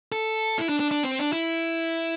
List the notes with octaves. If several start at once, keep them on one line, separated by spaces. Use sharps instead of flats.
A4
E4
D4
D4
D4
C4
D4
E4